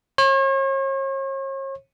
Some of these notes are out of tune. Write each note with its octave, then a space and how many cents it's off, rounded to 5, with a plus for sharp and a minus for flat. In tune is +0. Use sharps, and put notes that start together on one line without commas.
C#5 -40